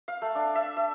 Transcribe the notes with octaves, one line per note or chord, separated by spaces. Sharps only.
F5
A3
D4
E5
E5